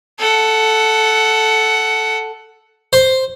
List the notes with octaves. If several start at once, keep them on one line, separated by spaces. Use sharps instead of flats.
A4 F#5
C5